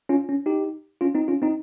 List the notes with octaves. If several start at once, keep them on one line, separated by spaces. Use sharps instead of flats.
C#4 F4
C#4
D#4 G4
C#4 F4
C4 D#4
C#4 F4
C4 D#4